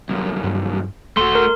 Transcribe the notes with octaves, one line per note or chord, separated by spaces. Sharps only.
C2 F#2
G2
D#1 A3 F#4 C6
A#4